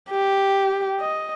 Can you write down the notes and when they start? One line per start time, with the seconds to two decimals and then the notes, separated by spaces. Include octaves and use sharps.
0.11 G4
1.00 D#5